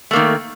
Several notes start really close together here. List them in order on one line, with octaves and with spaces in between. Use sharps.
A3 A#3 D#3